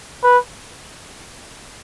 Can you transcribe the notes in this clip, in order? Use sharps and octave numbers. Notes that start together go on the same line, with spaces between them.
B4